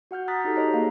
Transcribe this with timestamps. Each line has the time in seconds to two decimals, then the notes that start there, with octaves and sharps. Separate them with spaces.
0.11 F#4 F#5 F6 G6
0.28 A#5 D#6 F#6 A6 B6
0.45 D#4 F#4 G4 A4
0.56 A4 C5 C#5 D#5 A#5
0.74 A#3 G#4 C#5 D#5 F5